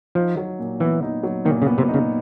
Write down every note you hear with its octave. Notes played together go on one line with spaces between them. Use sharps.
F3 D#4
F#3
A#2
E3 B3
D#4
F#3
A#2 D#3
C#3
B3
C3
D#4
C#3